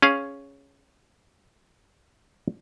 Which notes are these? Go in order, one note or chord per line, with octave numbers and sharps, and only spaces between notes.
C#4 G#4 F5